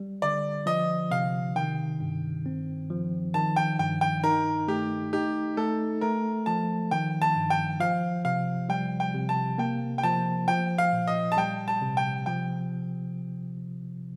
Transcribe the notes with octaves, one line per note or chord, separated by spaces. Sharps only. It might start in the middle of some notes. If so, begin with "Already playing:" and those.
Already playing: G3
D3 D5
F3 D#5
C3 F5
D#3 G5
G2
C4
F3
D#3 A5
G5
G2 G5
G5
D#4 A#4
A3 G4
D#4 G4
A3 A4
A3 A#4
F3 A5
D#3 G5
A5
G2
G5
F3 F5
C3 F5
G3 G5
G5
C3
A5
A#3 G5
G5
F3 A5
F3 G5
F5
A#2
D#5
A5
G3 G5
A5
C3
G5
F3 G5